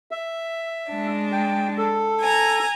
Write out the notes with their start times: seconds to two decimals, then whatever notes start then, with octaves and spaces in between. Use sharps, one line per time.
0.11 E5
0.90 G#3 D4
1.32 G5
1.78 A4
2.19 G#5 A#5